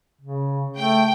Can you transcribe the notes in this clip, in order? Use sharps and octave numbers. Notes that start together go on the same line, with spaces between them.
C#3
A3 G5